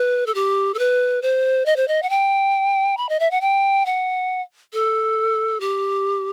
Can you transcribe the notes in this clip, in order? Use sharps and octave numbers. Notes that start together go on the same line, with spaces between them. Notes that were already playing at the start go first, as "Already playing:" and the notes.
Already playing: B4
A4
G4
A4
B4
C5
D#5
C5
D#5
F#5
G5
B5
D#5
E5
F#5
G5
F#5
A4
G4